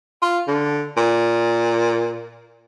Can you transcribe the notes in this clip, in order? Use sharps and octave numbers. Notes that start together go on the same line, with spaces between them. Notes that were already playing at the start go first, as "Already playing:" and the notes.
F4
D3
A#2